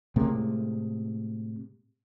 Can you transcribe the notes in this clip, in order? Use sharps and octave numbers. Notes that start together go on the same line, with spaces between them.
A2 C3 G#3 A#3